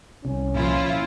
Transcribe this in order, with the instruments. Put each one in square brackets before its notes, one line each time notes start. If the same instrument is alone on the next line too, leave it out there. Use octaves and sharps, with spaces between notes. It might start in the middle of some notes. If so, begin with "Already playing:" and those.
[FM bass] C2 [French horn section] C#4
[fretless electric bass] A#2 F3 [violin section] E4 F4